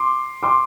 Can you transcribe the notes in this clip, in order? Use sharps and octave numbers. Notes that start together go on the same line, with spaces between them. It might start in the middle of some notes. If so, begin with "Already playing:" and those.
Already playing: C6 D6
C6 D6